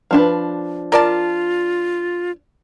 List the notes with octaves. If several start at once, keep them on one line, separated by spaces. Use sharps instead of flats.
F3 D4 B4
F4 A#4 D5 A5